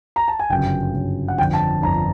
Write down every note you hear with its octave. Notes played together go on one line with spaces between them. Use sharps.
A#5
A5
G#5
G1 F#2 C#3 G5
G1 F#2 C#3
F#5
G1 F2 D3 G5
A5
G1 F2 D3 A#5